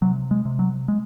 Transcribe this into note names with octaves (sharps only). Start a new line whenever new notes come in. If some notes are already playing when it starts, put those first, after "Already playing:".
C3 F#3
G#3
C3
F#3
G#3